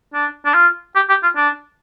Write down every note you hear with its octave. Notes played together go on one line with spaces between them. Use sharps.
D4
D4
F4
G4
G4
F4
D4